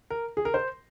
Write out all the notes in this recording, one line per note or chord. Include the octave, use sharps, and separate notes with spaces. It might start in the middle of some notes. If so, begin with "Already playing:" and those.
A#4
G#4
A#4
C5